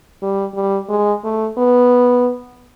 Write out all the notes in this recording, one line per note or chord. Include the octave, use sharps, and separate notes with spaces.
G3
G3
G#3
A3
B3